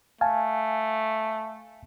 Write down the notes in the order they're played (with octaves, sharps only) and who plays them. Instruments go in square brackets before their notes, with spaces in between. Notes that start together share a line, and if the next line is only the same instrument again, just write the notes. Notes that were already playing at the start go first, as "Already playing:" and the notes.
[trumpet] A3 [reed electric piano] F5 G#5 A5